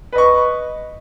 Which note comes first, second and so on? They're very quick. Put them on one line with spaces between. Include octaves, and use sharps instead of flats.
B4 D#5 C#6